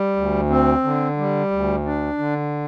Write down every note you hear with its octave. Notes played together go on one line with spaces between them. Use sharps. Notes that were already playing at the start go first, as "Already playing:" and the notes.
Already playing: G3
D2
C4
D3
G3
D2
D4
D3